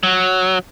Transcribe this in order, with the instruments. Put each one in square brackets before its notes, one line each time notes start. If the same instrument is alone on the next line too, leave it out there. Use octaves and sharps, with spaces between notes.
[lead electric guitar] F#3